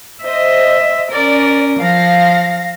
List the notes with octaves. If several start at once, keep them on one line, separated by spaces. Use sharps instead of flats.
C5 D#5 E5
C#4 A#4 D5
F3 F5 A#6